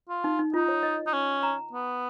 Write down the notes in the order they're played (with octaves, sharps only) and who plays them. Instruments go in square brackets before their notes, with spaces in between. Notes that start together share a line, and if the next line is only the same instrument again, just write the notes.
[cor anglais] F4
[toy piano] D#4
D#4
[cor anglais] D#4 [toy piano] F4
[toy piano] C#5
D#5
[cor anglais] D#4
C#4
[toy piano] A#5
[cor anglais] B3